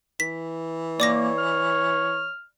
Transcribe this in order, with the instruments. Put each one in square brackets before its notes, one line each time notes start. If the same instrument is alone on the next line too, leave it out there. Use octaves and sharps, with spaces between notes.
[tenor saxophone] E3 [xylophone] B6
[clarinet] A#3 [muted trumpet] C#5 [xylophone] D5 D6 A#6
[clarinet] F6